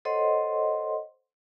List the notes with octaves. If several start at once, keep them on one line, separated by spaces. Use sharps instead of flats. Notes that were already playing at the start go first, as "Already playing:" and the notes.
A4 C5 C#5 D#5 F#5 C6